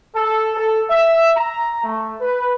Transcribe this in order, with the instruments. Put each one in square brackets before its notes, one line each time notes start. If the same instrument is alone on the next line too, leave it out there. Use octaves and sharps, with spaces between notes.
[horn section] A4
A4
E5
A#5
A3
B4